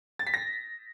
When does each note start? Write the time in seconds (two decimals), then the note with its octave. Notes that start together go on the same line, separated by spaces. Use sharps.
0.19 A6
0.27 B6
0.34 A#6